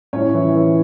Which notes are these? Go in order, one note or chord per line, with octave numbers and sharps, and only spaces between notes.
A2 C#4 C#5
E3
E3